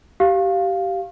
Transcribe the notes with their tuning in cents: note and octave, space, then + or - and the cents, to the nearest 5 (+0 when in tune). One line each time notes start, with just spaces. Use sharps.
G4 -20 F5 +0